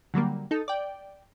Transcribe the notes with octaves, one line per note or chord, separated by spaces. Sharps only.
D3 F#3 G3 A#3
D#4 A4
D5 G5